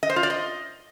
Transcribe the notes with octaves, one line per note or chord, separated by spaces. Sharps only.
D#5
C5
F4
D5
D#5